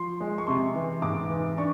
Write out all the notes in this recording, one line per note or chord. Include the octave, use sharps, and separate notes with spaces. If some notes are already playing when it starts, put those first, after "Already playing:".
Already playing: F3 C6
G#3
C#6
C3 C6
E3
G#2 D6
E3
D4 C#6